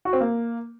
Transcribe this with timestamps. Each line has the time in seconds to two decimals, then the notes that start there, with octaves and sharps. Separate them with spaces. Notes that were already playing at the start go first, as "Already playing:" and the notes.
0.05 F#4
0.13 C4
0.20 A#3